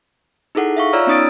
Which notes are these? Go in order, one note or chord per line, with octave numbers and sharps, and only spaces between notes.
D#4 E4 G#4 A4 F#5
E5 F5 C#6
F4 C#5 D5 A#5 E6 F6
B3 C#4 D#4 D#6 A6 D7